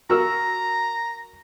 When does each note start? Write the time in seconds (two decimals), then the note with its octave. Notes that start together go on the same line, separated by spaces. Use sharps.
0.10 F#4 A#4 A#5 E6